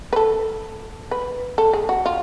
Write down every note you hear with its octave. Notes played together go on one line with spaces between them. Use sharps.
B4
A4
B4
A4
G#4
F#4
F4